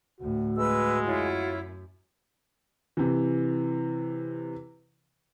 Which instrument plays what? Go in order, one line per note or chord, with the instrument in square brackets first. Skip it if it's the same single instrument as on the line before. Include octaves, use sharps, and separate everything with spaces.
[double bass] D2 A2 [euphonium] F#4
[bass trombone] G#3 [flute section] B4 E6
[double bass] F#2 [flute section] E4 F4 C#5
[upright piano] C3 E3